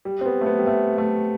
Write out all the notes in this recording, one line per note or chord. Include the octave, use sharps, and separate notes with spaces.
G3
C4
B3
A3
B3
G3
A3
A3